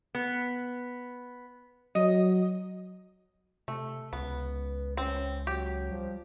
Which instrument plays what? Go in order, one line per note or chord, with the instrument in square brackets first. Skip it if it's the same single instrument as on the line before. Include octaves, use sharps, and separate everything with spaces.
[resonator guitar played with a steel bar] B3
[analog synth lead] F#3 [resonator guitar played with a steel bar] D#5
[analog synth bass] C3 [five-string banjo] A3
[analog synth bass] C#2 [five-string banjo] B3 [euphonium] B4
[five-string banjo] C4 [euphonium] C#4
[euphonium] F#3 [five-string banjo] G4
[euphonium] F3 [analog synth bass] G3